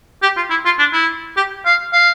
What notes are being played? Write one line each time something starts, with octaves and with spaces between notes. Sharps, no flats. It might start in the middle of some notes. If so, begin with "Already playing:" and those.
G4
F4
E4
F4
D4
E4
G4
F5
F5